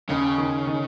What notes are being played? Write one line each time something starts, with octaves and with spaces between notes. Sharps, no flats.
D#2 C#3
D#3
D#3